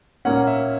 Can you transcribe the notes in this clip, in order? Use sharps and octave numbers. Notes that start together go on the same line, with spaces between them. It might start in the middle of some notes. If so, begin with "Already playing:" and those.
A#2 A#3 C#4 F#5
E5